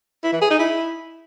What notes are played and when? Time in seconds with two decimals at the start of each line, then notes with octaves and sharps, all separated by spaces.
0.23 E4
0.32 E3
0.41 G#4
0.50 D#4
0.59 E4